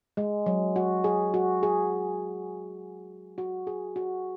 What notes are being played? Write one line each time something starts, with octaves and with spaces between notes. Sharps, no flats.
G#3
F#3
F#4
G#4
F#4
G#4
F#4
G#4
F#4